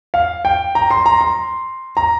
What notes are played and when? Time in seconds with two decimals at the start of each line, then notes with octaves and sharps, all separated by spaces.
0.14 F5
0.45 G5
0.75 A#5
0.90 C6
1.06 A#5
1.21 C6
1.97 A#5